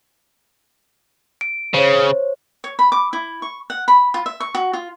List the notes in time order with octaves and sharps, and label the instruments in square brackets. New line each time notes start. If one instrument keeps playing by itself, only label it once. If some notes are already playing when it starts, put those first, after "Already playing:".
[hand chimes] D7
[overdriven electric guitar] C#3 [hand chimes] C5 C#5
[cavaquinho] C#5
B5
D6
E4
C#6
F#5
B5
F4
E5
C#6
F#4
F4